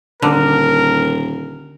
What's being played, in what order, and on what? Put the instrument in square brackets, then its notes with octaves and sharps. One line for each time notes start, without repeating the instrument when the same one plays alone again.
[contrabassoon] D#1 [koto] D3 [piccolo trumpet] A#4